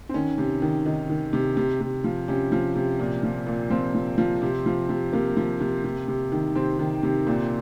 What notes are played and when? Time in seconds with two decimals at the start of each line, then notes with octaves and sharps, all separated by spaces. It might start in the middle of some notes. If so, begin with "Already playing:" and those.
0.09 C4
0.14 D#3 C#4
0.38 C3
0.62 D#3
0.86 D#3 D#4
1.09 D#3
1.33 C3
1.57 C3
1.81 C3
2.04 F3
2.28 C3 C#4
2.52 F3
2.76 C3
2.99 A#2
3.23 F3
3.47 A#2
3.70 F3 C4
3.94 F3
4.18 F3
4.42 C3
4.66 F3
4.89 C3
5.13 C3 A#3
5.37 F3
5.60 C3
5.84 C3
6.08 C3
6.32 D#3
6.55 C3 C4
6.79 D#3
7.03 C3
7.27 A#2